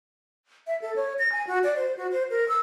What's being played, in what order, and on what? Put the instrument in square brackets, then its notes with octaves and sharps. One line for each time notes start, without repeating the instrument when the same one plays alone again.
[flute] E5
A4
C#5
A#6
G#5
F#4
D5
C5
F#4
C5
A#4
E6